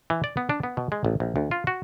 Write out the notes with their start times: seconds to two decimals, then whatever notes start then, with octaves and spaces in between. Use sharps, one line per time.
0.10 E3
0.24 D5
0.37 B3
0.49 D4
0.63 B3
0.77 B2
0.92 G#3
1.05 A1
1.20 A#1
1.36 D2
1.51 F4
1.67 F#4